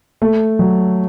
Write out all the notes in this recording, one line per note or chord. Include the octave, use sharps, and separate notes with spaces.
A3
F#3